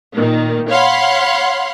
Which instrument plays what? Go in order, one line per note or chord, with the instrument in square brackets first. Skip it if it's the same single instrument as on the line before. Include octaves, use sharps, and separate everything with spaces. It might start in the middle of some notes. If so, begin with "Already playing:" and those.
[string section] A#2 D#3
C#5 F5 F#5 B5 C6